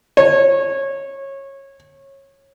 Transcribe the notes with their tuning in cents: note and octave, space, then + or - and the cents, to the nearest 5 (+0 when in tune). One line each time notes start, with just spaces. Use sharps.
C#5 -20